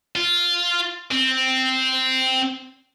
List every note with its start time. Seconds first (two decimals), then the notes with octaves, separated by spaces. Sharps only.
0.15 F4
1.11 C4